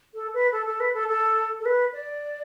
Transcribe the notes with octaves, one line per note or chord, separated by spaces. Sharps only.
A4
B4
A4
A4
B4
A4
A4
A4
B4
D5